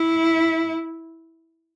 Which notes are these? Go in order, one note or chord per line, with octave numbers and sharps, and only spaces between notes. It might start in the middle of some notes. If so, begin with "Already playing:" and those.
Already playing: E4